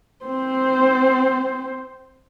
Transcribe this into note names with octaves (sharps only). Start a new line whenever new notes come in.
C4 C5